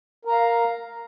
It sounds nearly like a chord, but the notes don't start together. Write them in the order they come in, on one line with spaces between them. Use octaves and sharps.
A#4 A#5 F5